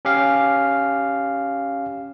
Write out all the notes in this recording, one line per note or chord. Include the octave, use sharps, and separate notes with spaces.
C#4 G4 F5